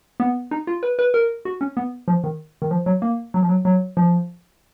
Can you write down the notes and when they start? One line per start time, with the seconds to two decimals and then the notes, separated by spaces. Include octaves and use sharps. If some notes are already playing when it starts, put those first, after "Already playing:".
0.20 B3
0.51 D#4
0.67 F4
0.83 B4
0.99 B4
1.14 A#4
1.45 F#4
1.61 C#4
1.77 B3
2.08 F3
2.24 D#3
2.62 D#3
2.71 F3
2.86 F#3
3.02 A#3
3.34 F#3
3.43 F3
3.49 F#3
3.65 F#3
3.97 F3